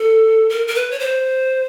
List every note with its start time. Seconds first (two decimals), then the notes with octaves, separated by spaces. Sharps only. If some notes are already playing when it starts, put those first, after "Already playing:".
Already playing: A4
0.50 A#4
0.67 A#4
0.75 B4
0.91 C#5
1.00 C5